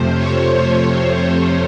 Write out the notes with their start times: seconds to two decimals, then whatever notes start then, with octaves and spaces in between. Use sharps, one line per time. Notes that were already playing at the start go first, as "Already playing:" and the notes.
Already playing: F2 C3 F3 A3 C5
0.13 C#5